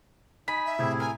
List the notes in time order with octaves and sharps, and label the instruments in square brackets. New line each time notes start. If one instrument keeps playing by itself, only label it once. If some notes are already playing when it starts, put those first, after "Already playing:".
[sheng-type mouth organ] D#4 G#5 [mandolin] B5 [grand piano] B6
[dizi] E5
[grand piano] A2 C3 [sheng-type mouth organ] E4 G#4
[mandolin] A#4 [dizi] G#5